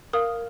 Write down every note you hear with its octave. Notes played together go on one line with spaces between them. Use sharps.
A#4 F5 D#6